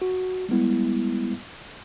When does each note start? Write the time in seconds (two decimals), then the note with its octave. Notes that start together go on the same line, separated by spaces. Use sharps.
0.02 F#4
0.49 G3 G#3 B3 E4